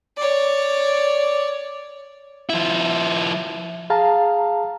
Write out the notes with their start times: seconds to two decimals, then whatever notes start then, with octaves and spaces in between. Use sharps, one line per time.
0.17 C#5 D5
2.49 F3 E4
3.90 G#4 F5 A5 A#5